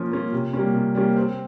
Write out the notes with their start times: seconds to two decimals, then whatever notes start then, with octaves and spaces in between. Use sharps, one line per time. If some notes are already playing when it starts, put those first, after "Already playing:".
Already playing: F3 A#3 C#4 F4
0.12 A#3 C#4 F4
0.32 C3
0.53 G3 A#3 C#4
0.74 C3
0.95 G3 A#3 C#4
1.17 C4